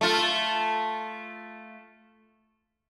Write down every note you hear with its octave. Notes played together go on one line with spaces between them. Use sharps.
A3 F4